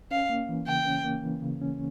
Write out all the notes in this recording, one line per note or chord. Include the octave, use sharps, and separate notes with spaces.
C#4 F5
A#3
E3
C#3 G5
C#4
A#3
E3
C#3
C#4